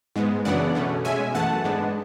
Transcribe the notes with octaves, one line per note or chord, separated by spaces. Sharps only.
G#2 G#3 B3
F#2 C#3 E3 B3 D4 D5 F#5
B2 A3 C#4
B2 G#3 C#4 E5 G#5
F#2 E3 A3 F#5 A5
G#2 G#3 B3 D4